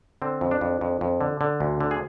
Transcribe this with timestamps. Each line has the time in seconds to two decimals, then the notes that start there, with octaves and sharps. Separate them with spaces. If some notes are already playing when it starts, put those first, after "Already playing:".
0.22 D3 C4
0.41 F2
0.51 D4
0.61 F2
0.81 F2
1.01 F2
1.21 D3
1.41 D3
1.60 D2
1.81 D3
1.91 G#4